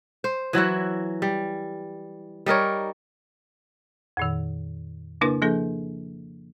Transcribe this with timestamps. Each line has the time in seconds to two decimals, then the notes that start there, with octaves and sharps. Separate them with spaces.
0.24 C5
0.53 E3 F#3 E4 F#4
1.22 G3
2.46 G3 D#4 A#4 C#5
4.17 F2 A#2 D#3
5.21 C#3 A#3 D4 E4 A#4 B4
5.42 F3 A#3 D4 G#4 A4